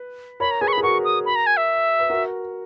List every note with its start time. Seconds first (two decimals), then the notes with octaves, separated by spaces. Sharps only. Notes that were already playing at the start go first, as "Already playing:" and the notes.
Already playing: B4
0.40 A#4 C#5 B5
0.51 A#5
0.61 G#4 B4 G#5
0.68 C#6
0.73 B5
0.78 G#4
0.83 F#4 A#4 C#6
1.04 D#6
1.25 B5
1.36 A#5
1.47 G#5
1.57 E5
2.00 B4
2.10 F#4 A#4